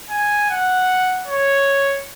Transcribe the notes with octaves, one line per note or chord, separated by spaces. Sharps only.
G#5
F#5
C#5